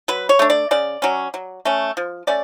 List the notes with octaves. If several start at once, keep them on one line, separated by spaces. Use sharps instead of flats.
F#3 B4
C#5
A3 D4
D5
C#3 D5
F#3 C#4
F#3
A3 C#4
F3
A3 C#4 D5